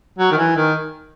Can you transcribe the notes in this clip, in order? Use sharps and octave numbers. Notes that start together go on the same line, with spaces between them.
F#3
D#3
E3
D#3